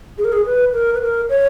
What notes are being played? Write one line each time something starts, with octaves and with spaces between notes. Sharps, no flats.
G#4
A#4
G#4
B4
A#4
B4
A#4
C#5